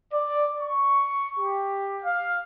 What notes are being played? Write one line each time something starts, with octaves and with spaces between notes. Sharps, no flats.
D5
C#6
G4
F5